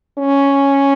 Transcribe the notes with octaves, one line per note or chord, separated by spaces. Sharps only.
C#4